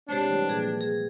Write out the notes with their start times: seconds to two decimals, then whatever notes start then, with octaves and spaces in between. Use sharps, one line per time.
0.09 C3 G#3 C4 D4 G4 C5 C#5
0.30 E3 G3 A3
0.49 A#2 F3 A#3 G#4
0.81 G#4